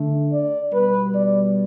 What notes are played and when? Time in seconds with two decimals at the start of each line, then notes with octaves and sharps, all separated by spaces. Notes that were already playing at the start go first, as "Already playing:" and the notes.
Already playing: D3 A3
0.33 D5
0.73 B2 G3 B3 B4
1.13 D5